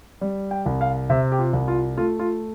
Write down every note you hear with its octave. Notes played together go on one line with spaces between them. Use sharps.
G3
G5
C2
F5
C3 E5
G4
F4
C2
F4
A3 F4
F4